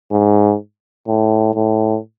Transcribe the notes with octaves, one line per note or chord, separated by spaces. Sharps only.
G#2
A2
A2